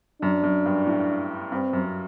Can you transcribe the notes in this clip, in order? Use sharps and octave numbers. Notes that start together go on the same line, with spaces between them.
F#2 D4
F#2
G2
A2
G2 C4
F#2